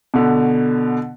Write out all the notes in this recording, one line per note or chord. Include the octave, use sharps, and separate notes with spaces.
B2 D3